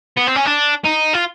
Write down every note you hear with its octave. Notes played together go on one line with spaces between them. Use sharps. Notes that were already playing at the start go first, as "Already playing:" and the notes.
B3
C4
C#4
D4
D#4
F4